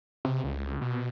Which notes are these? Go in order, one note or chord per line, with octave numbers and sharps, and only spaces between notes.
C3
C#2
B2